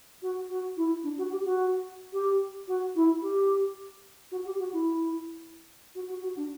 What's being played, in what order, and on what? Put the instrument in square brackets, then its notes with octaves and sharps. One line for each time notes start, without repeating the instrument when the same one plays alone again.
[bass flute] F#4
F#4
E4
D4
F#4
G4
F#4
G4
F#4
E4
G4
F#4
G4
F#4
E4
F#4
F#4
F#4
D4